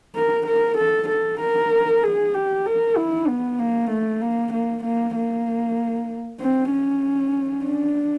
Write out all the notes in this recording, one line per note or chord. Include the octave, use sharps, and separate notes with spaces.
A#4
A#4
A4
A4
A#4
G#4
G4
A#4
E4
B3
A#3
A3
A#3
A#3
A#3
A#3
C4
C#4
D4